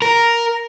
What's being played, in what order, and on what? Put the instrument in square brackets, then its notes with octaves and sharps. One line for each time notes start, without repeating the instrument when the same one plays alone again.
[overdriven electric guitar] A#4